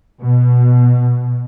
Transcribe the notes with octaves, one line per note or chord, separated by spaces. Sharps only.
B2